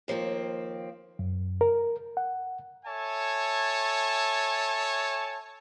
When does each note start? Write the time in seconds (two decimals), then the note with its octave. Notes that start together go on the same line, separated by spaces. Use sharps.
0.08 D#2 F3 A#3 C4
1.19 F#2
1.61 A#4
2.17 F#5
2.85 A4 C#5 E5 G#5 A5